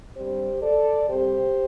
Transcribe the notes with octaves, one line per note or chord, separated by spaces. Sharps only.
G2 G3 C4 G4 C5
A4 D5
C3 G3 C4 G4 C5